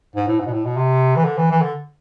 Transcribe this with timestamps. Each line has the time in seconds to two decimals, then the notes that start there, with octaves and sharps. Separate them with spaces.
0.16 G#2
0.27 A2
0.40 G#2
0.47 B2
0.52 A2
0.65 B2
0.77 C3
1.16 E3
1.25 D3
1.38 E3
1.51 E3
1.62 D3